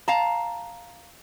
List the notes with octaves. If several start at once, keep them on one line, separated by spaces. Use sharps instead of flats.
F5 A5 A#5